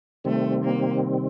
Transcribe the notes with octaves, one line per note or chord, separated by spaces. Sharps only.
C3 D#3 G3 A3 C4
A#3